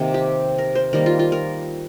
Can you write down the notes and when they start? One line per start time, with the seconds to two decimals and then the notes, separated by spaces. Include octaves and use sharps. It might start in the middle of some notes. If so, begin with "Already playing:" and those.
Already playing: C3 D#3 A#3 C4
0.14 G4
0.58 A#4
0.75 C5
0.93 D#3 G3 A#3 A#4
1.06 F4
1.19 F4
1.32 A#4